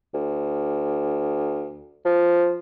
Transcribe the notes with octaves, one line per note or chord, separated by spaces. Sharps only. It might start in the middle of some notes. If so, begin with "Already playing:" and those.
D2
F3